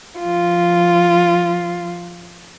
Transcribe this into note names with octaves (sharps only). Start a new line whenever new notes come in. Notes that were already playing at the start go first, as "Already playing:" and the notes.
F3 F4